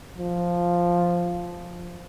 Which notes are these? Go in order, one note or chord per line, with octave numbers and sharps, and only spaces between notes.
F3